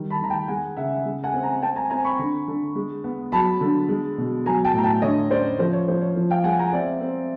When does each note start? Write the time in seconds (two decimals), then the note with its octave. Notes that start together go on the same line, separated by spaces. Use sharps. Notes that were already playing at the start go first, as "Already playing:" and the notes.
Already playing: D#3 G3
0.10 A5 B5
0.20 D#3 A#5
0.30 G5 A5
0.48 G#3 F#5 G#5
0.77 C#3 E5 F#5
1.05 G#3
1.24 F#5 G#5
1.34 C4
1.43 G#5 A#5
1.62 C4 G5 A5
1.76 G#5 A#5
1.90 C4 G#5 A#5
2.04 B5 C#6
2.19 D3
2.48 D3
2.75 G#3
3.04 B3
3.32 F#3 A5 B5
3.61 D3
3.89 G#3
4.18 B2
4.46 F#3 G#5 A#5
4.65 G5 A5
4.74 A2 A#5
4.83 G5 A5
5.02 D3 C#5 D#5
5.31 C#4 C5 D5
5.59 F3 C5
5.73 C#5
5.88 F3 C5
6.01 C#5
6.16 F3
6.30 F5 G5
6.44 G#3 F#5 G#5
6.59 G#5 A#5
6.72 C4 D5 E5
7.01 C4